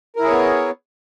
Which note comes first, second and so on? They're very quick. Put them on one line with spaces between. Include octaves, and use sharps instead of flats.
A#4 E4 G#4 C#5 B3